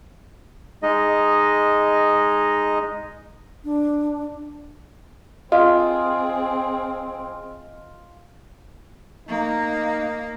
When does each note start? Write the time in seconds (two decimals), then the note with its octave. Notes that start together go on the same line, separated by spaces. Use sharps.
0.83 G#3 D#4 D#5
3.64 D4
5.52 C4 F4 G#4 D#5
9.29 A#3 D#4